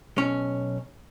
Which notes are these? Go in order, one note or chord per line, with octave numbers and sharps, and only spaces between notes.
B1 C#4